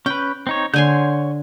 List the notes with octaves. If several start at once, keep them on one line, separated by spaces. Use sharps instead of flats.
C#4 B4 G5
C4 D#4 C#5
D3 C#5 G#5 C6 G6